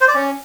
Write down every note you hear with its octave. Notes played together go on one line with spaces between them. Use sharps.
C5
D5
C#4